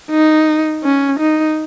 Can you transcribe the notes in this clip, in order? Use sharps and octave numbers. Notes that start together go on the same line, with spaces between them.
D#4
C#4
D#4